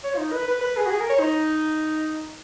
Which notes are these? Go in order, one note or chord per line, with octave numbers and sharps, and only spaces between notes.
C#5
F4
D#4
B4
B4
B4
G#4
F#4
G#4
A#4
C#5
D#4